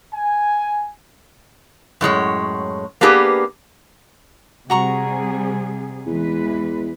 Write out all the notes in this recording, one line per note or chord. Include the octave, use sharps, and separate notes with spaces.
G#5
F#2 A2 G#3 C#5
A#3 B3 D4 G4 G#4 B4
C3 G3 F#4 G#4 A#5 C#6
E2 E3 G#3 B4